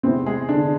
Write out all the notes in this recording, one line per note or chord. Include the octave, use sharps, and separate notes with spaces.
E2 C3 E3 G#3 B3 C4
G#3 G#4
D3 D4